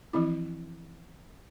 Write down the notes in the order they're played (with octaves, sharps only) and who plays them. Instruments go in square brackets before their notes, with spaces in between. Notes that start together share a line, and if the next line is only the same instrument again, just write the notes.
[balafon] E3 F3 C4 E4